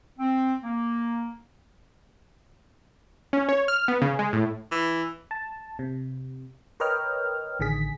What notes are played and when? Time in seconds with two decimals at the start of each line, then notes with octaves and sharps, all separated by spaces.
0.19 C4
0.62 A#3
3.33 C#4
3.49 C#5
3.68 F6
3.88 B3
4.02 C#3
4.19 G#3
4.33 A2
4.72 E3
5.31 A5
5.79 C3
6.80 A#4 B4 C#5 D#5 G5 F6
7.60 A1 D3 D#3 G#4 B6